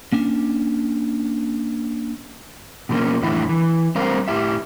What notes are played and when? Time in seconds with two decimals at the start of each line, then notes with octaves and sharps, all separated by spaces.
0.12 A#3 C#4 D4
2.89 B2 F3 F#3 A#3 C#4
3.22 F2 A2 D3 E3 A3 E4
3.49 E3
3.95 G3 A3 C4 A#4 C5 F5
4.28 A2 E4 G4 E5